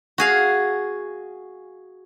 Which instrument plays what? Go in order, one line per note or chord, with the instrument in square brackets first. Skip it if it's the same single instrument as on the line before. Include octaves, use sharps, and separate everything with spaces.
[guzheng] F#4 G#4 F5